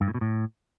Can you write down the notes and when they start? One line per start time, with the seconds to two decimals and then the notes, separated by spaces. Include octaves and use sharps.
0.01 G2
0.08 A2
0.14 B2
0.21 A2